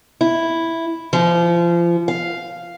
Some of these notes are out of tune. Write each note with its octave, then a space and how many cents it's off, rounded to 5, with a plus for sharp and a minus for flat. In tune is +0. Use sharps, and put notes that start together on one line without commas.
E4 +0
F3 -30
F5 +0